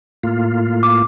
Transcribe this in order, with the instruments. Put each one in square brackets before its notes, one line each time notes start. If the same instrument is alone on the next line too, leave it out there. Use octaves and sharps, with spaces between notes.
[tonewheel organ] A2 A#3 F4
[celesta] D6